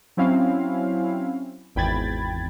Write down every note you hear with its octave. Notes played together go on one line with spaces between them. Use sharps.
F#3 C4 C#4 E4 F5
G#1 E2 G5 B5 G#6 A6